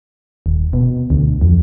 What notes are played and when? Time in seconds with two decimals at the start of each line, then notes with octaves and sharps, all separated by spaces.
0.46 D#1
0.73 B2
1.10 D2
1.41 F2